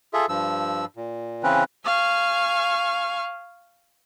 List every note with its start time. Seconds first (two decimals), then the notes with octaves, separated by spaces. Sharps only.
0.14 F4 G#4 A4 E5
0.29 G2 F3 E6
0.96 A#2
1.43 C#3 E3 C4 C#4 B4
1.86 F5 G#5 C#6